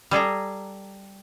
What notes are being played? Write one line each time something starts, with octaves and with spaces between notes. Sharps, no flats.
G3 G#4 A4 A#5